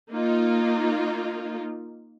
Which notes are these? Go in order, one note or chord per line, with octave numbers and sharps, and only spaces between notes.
A#3 D#4 F4